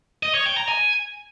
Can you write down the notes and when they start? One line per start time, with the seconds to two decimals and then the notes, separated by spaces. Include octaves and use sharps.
0.23 D#5
0.34 C#5
0.46 G5
0.57 A#5
0.69 G#5